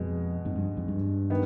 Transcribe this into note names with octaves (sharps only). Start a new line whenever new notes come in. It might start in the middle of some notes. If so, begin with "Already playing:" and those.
Already playing: F2 B2 G#3
F2 G#2
G2
F2 G#2
G2
D#3 B3